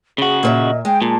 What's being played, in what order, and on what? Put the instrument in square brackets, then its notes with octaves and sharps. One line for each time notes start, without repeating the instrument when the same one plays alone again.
[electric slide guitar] C#3 F#4 [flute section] G#4
[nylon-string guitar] A#2 C5 E5 [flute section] D#5
[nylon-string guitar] G#3 [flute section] G5
[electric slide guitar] A#2 [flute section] A5